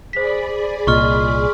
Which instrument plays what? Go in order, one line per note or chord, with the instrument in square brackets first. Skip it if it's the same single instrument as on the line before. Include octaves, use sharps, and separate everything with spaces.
[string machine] G#4 D5 B5 [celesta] C5 B6
[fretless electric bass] C2 A#2 [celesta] F4 D#5 [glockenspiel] C6 C#6 F6